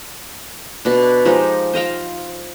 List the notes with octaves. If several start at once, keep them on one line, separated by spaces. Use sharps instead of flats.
B2 D4
F3 G#3 D#4 G4
C5 D#5 F5 G5